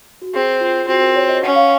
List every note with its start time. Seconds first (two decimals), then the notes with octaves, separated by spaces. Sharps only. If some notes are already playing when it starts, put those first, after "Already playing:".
0.22 F#4
0.34 C4 G#4
0.61 F4
0.88 C4 F#4
1.02 A#4
1.16 C#5
1.29 D#5
1.43 C#4 F#5
1.55 F5